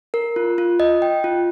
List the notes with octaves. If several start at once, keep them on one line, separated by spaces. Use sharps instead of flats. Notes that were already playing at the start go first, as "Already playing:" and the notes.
A#4
F4
F4
D#5
G5
F4